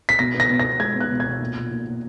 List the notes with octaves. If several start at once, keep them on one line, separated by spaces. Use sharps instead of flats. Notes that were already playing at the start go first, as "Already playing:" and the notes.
B6
B2 A#6
B3
A#6
B2
A#6
B2
G#3 G#6
B3
F#6
B2
G#6
B2
A#2
A#2
A#2
A#2